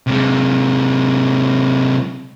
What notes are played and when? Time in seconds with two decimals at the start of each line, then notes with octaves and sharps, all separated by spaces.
0.07 C3 G#3